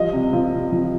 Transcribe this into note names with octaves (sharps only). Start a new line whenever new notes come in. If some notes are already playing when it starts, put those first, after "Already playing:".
Already playing: F3 G3 D#5
C3
F3
C3
F3